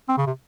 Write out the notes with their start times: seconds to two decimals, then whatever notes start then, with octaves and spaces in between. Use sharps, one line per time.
0.09 C4
0.18 C#3
0.27 C3